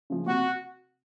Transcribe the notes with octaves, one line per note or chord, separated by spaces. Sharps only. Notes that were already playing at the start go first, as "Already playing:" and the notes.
C#3 F3
C3 F#4